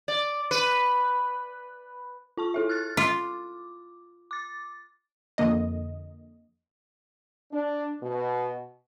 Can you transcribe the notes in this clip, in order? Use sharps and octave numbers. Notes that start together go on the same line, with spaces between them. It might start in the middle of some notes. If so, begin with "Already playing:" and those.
D5
B4
F4 A5 C#6
E4 A4 E5
F6 F#6 A6
F4 D6
D6 A6
F2 D3 A#3 D#5
D4
B2